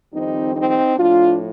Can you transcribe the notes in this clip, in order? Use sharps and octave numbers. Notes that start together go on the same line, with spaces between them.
F2 D#3 G3 C4 D#4
C4 D#4
A2 F3 D4 F4